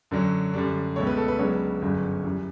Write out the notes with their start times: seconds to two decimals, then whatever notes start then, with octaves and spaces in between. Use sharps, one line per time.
0.11 F#2 D3 F#3 C#4
0.54 F#2 D3 G3 D4
0.96 C#2 B2 A3 C#5
1.07 B4
1.17 A4
1.28 B4
1.39 C#2 C#3 F#3 B3 D4 C#5
1.82 G1 F#2 C#3 F#3
2.24 F#2 E3 G3